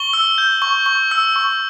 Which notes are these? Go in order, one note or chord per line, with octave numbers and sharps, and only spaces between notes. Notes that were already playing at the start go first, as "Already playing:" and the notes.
Already playing: C#6 G7
E6
G6
C#6
C#6
E6
C#6